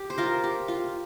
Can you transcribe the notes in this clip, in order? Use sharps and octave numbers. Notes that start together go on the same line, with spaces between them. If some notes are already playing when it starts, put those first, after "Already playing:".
Already playing: G4
C5
F4 A#4
G4
F4